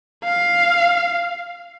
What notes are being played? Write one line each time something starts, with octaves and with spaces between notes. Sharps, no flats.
F5